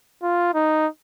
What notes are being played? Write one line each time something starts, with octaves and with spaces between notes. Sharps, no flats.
F4
D#4